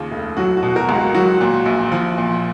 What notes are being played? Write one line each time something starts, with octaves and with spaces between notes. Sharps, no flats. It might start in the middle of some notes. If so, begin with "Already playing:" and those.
Already playing: D#2 C#3 F4
F1
F#3 F#4
F#4
B2
F#4 A#4
C#2
F#4
F#3 F#4
A#2
A#1
F3
A#2